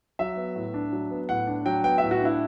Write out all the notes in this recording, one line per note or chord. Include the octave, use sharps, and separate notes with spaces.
F#3 E5
B3
A2
D4
F#3
B3
A2 F#5
D4
F#3 G5
B3 G5
A2 E5
F#4
D4 E4